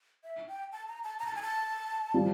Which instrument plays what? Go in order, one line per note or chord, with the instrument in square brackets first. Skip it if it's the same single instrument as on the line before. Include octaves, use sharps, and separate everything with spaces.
[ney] E5
G5
A5
A#5
A5
A#5
A5
G#5
A5
[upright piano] F3 G3